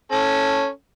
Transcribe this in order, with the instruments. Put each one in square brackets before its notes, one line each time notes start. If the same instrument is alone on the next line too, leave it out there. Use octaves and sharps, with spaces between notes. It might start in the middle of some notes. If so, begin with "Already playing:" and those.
[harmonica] C#4 A4